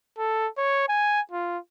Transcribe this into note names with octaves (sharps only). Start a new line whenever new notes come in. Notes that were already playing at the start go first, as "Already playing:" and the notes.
A4
C#5
G#5
F4